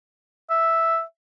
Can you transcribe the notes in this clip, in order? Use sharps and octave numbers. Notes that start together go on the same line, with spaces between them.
E5